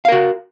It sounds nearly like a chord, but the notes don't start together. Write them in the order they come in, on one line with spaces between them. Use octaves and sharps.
F5 A#4 F#4